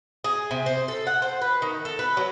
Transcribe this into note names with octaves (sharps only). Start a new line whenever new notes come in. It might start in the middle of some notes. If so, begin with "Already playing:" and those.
G#4
C3
C5
A4
F#5
C5
B4
D#3
A4
B4
F#3